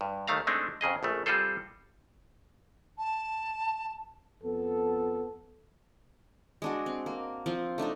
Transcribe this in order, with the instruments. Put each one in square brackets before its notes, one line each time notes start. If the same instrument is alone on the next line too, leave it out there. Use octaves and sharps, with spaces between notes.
[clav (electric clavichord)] G2
D#2 D#3 A3 F5 A#5
G#3 A3 C4 D4 D#4
F2 C#3 G#4 D#5
A#1 C#3 A3
G3 C4 F4 G#4 A4 C5
[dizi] A5
[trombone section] F2 B3 A4
[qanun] G#3 D4 F#4
C4
A#3
F3 C4
A3 D4 D#4 A4